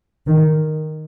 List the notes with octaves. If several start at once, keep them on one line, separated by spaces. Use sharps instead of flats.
D#3